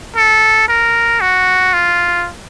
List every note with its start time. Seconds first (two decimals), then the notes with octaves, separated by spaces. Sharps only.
0.16 A4
0.69 A#4
1.21 F#4
1.74 F4